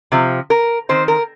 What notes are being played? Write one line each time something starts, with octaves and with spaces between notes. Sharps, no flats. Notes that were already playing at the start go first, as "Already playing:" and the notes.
C3 F3
A#4
D#3 C4 C5
A#4